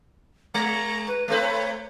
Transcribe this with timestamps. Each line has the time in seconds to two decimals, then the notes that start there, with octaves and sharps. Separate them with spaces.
0.54 G#3 A#5
1.08 B4
1.28 A3 C4 A4 B4
1.41 C#5